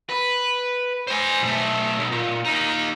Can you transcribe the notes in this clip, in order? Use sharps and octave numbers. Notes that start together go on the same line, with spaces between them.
B4
C5 G#5
B1 A3
B1
A#2
A#3 D#4